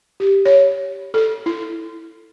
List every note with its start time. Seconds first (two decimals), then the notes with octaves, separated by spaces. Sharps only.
0.20 G4
0.45 C#5
1.14 A4
1.46 E4